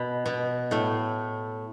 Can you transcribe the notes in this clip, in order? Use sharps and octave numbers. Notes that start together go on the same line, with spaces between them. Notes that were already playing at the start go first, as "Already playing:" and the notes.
Already playing: B2
B2
A2 A3